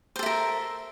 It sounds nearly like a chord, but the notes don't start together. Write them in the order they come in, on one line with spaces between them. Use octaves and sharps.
C5 A4 E5 A#4